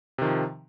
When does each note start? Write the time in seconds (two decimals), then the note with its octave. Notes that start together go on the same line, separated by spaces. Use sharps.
0.18 C3
0.22 D#3
0.25 F3